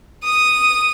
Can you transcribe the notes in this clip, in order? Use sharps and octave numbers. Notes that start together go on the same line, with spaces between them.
D#6